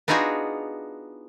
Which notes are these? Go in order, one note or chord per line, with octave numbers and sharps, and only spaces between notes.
B3 D4 D#4 F4 F#4 G#4